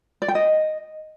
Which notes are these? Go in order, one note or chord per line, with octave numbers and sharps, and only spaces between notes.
D5
G5
D#5